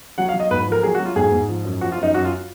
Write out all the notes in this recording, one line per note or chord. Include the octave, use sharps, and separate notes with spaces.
F#3 F#5
F5
F#3
D#5
G#2 B4
F3 A#4
F#3 G#4
F#4
F#3
F4
G#2 G#4
G#2
F3
F#2
F3 F#4
F4
F#2 D#4
F#2 F#4
F4